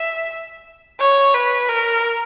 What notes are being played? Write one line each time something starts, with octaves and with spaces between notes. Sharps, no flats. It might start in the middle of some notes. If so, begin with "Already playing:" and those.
Already playing: E5
C#5
B4
A#4